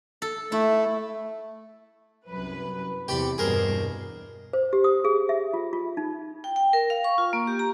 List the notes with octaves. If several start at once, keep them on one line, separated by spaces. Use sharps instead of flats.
A4
A3 E4
C2 F#2 B4
E2 C3 G4 D5 B5
E2 G2 B2 G#4 A#4 C5
C5
G4
D#6
G#4
E5
F4
F4
D#4
G5
G5
A#4
F5
C#6
F4
A#3
G4
A#5